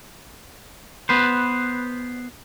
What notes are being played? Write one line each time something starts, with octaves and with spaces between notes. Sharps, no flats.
B3 B4 C5